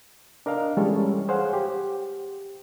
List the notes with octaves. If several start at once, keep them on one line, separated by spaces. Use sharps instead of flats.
D4 A#4 D#5 F5
E3 G3 G#3 C#4 A4 C#5
G#4 C5 C#5 F5 F#5
G4